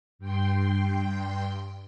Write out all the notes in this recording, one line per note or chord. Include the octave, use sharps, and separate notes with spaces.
G2 G5 C6